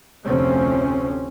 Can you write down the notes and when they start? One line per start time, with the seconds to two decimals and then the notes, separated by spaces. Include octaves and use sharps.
0.24 F1 D2 C3 F3 C4 C#4